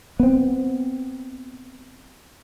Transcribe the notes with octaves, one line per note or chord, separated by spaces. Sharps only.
B3 C4